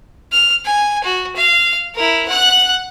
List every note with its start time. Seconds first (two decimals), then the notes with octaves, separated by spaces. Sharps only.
0.32 F6
0.65 G#5
1.04 F#4
1.36 F5
1.95 E4 A#4
2.28 F#5 F#6